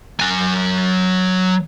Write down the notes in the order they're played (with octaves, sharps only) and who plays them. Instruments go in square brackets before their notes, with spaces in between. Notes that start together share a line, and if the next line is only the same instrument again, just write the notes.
[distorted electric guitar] F#3 G#5